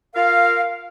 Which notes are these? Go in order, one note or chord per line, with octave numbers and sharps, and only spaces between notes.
F4 A#4 F5